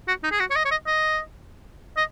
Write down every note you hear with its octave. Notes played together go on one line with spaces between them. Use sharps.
F#4
D#4
G#4
F#4
C#5
D#5
C#5
D#5
D#5
D#5